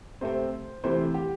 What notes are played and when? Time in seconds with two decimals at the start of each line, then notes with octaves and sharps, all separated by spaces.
0.21 C3 A3 C4 C5
0.84 C3 E3 A3 C4 C5
1.14 G4